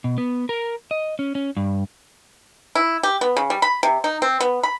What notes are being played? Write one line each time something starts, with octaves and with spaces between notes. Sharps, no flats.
B2
B3
A#4
D#5
C#4
C#4
G2
E4
G4
B3
C#3
G3
B5
C3
D#4
C4
B3
B5